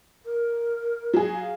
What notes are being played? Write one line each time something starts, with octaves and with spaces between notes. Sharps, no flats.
A#4
F#3 G#4
F5